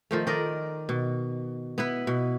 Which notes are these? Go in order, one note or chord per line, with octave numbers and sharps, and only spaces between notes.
D#3 F3 A3
D#3 A#4 D5 D#5
B2
B3 E4 B4
B2